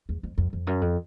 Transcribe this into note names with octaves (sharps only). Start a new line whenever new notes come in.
E2
F2
F2
F2
F#2
F2